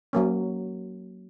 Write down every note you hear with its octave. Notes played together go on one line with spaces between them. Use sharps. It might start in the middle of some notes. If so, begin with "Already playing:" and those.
F#3 A#3 C#4